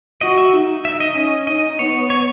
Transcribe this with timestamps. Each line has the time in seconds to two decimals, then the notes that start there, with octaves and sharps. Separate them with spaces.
0.21 F#4 D#5
0.38 E5
0.54 D#4
0.85 E5
1.00 D#5
1.15 C#4 D#5
1.47 D#4 D#5
1.79 B3 C#5
2.10 C#5